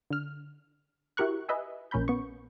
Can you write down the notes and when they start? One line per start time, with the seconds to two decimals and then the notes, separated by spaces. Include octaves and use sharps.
0.10 D3 F6
1.17 E4 F#4 G4 A#4 C#6 F#6
1.49 B4 D#5 E5 G#5
1.91 A#1 A#2 C#4 A#4 B5 G6
2.08 B3 C#6